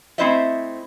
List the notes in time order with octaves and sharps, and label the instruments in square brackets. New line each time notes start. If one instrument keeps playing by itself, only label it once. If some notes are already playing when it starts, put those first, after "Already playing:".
[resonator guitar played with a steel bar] A3 C4 E4 C5 D#5 E5